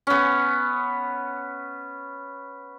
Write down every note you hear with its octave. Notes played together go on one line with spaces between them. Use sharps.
B3 C#4